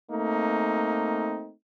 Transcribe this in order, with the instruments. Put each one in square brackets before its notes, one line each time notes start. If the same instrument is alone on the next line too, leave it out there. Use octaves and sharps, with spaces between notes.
[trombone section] A3 A#3 C4 D#4